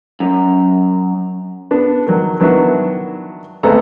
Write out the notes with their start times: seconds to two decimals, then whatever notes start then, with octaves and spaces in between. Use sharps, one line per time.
0.20 F#2
1.71 B3 D4
2.07 D#3 F#3
2.40 D#3 F#3 B3 D4 E4 F#4
3.63 G#1 D2 B3 C4 A4 A#5